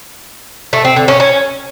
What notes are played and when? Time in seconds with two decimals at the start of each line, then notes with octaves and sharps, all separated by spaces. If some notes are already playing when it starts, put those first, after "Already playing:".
0.73 A3
0.85 C4
0.96 D3
1.08 C#4
1.20 C#4